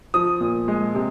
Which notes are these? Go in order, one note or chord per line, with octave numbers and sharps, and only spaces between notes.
F3 D#6
A#2
G#3
C3